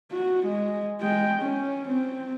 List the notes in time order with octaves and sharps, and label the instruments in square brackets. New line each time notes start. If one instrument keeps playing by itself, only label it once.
[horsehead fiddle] F#4
G#3
G#3 G5
C#4
C4